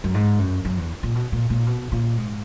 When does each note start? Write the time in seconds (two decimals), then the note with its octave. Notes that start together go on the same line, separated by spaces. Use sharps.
0.04 F#2
0.14 G#2
0.39 F#2
0.65 F#2
0.77 E2
1.03 A#2
1.15 B2
1.32 A#2
1.50 A#2
1.67 B2
1.92 A#2
2.17 G#2